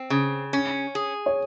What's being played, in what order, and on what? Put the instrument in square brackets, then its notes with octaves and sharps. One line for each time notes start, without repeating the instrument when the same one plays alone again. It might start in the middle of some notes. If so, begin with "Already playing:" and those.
Already playing: [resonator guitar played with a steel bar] C4
C#3
C#4
G#4
[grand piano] C#5